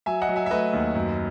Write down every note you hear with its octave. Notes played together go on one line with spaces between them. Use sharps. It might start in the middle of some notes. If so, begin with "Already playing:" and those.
F#3 E5 G#5
D#5 F#5
F#3
E5 G#5
E5
A3 B4 D#5
D#2
F#2